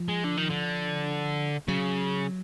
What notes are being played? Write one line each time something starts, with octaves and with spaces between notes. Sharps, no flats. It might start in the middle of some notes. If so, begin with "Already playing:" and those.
Already playing: F3
G#3
D3
D#3
D3
C#3 F#3